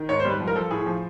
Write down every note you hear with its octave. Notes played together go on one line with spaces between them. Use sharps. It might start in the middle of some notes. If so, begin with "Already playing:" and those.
Already playing: D#3
G#2 C#5
C5
G3 B4
F3
A#4
F3 A4
A2 G#4
F3